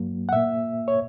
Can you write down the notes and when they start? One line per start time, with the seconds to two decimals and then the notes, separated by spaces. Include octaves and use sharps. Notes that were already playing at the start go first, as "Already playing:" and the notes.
Already playing: G2 F#3 A#3
0.29 F#5
0.33 A#2 A#3 E5
0.88 C#5